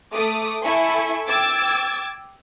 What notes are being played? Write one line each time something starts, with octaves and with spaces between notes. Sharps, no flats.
A3 D6 D#6
E4 A4 E5 G#5 C#6
G5 D6 E6 G#6 A6